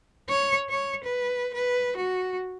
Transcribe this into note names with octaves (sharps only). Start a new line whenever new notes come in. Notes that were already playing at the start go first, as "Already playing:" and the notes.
C#5
C#5
B4
B4
F#4